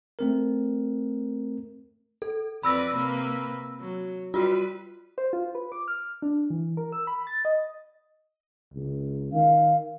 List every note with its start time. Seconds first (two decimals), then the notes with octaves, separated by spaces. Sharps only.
0.19 A3 C4 A#4
2.22 A4
2.63 F2 B4 D5 B5 E6 A#6
2.93 C3 A#3 B4
3.79 F#3
4.34 G3 F4 F#4 B4
5.18 C5
5.33 F4
5.55 B4
5.72 D6
5.88 F6
6.22 D4
6.50 E3
6.77 A#4
6.92 E6
7.07 B5
7.27 A6
7.45 D#5
8.74 C#2
9.33 D#3 F5